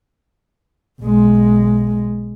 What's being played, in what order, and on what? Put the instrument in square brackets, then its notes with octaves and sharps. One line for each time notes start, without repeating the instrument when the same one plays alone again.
[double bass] B1 G#3